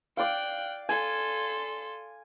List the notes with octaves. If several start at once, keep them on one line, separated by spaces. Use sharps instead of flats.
D5 F5 G5 F#6
A4 G#5 C6